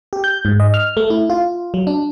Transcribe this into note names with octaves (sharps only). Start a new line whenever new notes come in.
G4
G6
G#2
D#5
F6
A3
E4
F4
F#3
D4